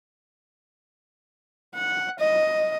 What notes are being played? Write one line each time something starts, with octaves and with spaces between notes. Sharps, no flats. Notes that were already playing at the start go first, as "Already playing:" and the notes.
F#5
D#5